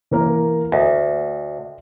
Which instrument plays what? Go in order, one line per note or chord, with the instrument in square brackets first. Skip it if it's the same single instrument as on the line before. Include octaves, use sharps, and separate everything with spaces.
[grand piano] E3 A#3 A#4
[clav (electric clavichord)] D2 [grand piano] D#5